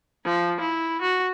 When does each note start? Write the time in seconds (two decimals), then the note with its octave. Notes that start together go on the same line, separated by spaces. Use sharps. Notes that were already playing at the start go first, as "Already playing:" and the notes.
0.24 F3
0.60 E4
1.01 F#4